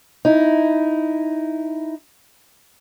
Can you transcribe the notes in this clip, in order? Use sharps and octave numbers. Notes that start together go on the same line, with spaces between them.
D#4 E4